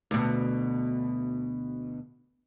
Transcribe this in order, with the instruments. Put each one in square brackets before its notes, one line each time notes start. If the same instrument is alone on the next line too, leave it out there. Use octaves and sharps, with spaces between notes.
[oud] D2 B2